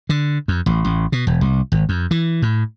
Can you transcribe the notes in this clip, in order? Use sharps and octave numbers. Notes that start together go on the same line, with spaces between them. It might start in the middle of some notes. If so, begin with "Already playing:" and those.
D3
F2
A1
A1
B2
E1
C2
G#1
F2
E3
A2